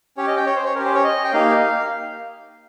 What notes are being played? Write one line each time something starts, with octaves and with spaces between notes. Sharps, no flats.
C#4 G4 C#5
D#5
G5
C#5
C5
C#5
C#4 G4 A#4
C5
C#5
D#5
G5
A#3 D#4 G4 F5